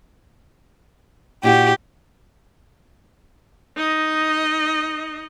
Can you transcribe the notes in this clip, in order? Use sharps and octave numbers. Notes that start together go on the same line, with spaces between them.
A#2 E4 F#4 G4
D#4 D#5